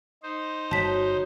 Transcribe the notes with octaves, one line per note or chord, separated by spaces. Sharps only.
D#4 C5
G1 F#4 C#5 A5 B6